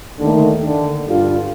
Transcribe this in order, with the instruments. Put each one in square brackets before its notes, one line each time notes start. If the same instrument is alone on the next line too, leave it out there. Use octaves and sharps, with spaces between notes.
[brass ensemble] D#2 D#3 A3 [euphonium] D3
[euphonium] D3
[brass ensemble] G2 D3 G3 D4 F4